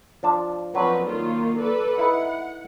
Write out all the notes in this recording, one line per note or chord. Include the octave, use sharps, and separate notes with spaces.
F3 D4 A5
F3 F#3 C4 D4 B4 C5
D#3 A#3 F4
A4 B4 D5
D#4 E4 F#5